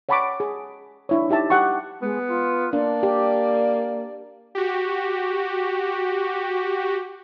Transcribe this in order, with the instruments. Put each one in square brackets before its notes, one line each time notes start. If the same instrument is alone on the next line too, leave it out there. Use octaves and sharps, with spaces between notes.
[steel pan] C#5 F#5 A5 B5 C#6 D6
G#4
D4 E4 C#5
D#4 G4 E5 A5
G4 F#5 C#6
[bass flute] G#3 [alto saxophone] B3
[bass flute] F4
[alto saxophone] A#3 [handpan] D4 [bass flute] D5
[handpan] G4
[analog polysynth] F#4 G4